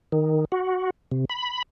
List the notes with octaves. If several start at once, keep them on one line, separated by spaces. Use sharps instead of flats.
D#3
F#4
C3
B5